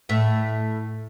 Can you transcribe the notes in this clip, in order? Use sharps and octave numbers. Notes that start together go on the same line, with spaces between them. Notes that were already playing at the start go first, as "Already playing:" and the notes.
A2 E5